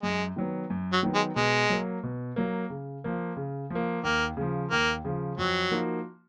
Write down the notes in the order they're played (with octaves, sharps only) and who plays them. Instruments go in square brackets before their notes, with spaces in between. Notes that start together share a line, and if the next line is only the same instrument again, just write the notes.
[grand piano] F#2 [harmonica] G#3
[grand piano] D#3 F#3 B3
F#2
[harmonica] F#3
[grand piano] D#3 F#3 B3
[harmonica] G#3
[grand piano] B2 [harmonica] G#3
[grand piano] F#3 A#3
B2
F#3 A#3
C#3
F3 A#3
C#3
F3 A#3
[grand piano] D#2 [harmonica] A#3
[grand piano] C#3 F3
[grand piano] D#2 [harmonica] A#3
[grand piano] C#3 F3
[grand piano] F2 [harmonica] F#3
[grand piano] F3 A#3 D#4 F#4